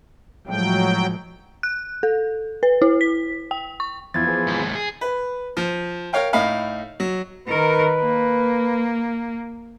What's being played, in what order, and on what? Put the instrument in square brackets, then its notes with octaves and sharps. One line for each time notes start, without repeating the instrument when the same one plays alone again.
[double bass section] A2 F3 G#3 [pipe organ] F#3 G5
[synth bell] F#6
A4
B4
E4
B6
G5
C#6
[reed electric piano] E2 B3 E4 [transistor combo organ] E3 F3 [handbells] G#6 A6
[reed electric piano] B3 G#4 C5
[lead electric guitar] D#2 G#2
G#4
[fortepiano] B4
F3
A#4 C#5 F5 G5
A2 D#4 F5 B5
F#3
[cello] D#3 A#4 [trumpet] B4
[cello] A#3